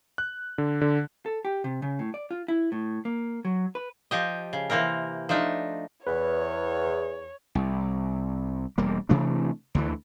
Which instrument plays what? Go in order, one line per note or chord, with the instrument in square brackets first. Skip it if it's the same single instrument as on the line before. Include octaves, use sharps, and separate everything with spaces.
[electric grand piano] F#6
D3
D3
[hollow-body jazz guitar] A4
G4
C3
C#3
A2
D5
F4
E4
A2
A#3
F#3
B4
[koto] F3 G4 D#5
C#3
C3 E3 A#3 C4 A#4
F3 A3 D4 D#4
[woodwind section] E2 [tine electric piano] B4 [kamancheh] C#5
[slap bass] C2
E1 G3 A#3
C3 E3 A3 D4
D2 D3 E3